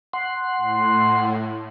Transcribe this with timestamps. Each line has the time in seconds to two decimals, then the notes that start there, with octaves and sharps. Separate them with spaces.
0.13 F#5 C6
0.57 A2